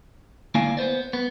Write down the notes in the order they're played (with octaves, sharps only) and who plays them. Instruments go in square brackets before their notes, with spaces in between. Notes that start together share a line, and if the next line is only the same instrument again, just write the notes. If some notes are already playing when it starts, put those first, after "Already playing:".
[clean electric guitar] D2 A#3 E4 D5 F5 G#5
B3 B4 C5 D5
B3